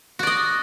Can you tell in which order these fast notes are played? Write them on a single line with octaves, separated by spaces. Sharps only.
F#4 D5 D#5